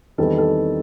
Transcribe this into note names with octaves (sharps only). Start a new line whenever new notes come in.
E2 D#3 G3 C4 A4
A4